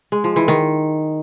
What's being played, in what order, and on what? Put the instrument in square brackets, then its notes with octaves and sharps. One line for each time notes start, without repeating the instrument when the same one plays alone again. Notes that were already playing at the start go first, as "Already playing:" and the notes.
[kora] G#3
F3
E3
D#3